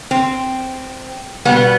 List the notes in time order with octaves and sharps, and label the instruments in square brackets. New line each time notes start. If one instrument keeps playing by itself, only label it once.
[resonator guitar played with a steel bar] C4
B2 G3 B3